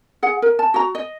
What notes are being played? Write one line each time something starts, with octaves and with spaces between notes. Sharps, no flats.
G#4 F#5
A#4
A5
F#4 A#5
D#5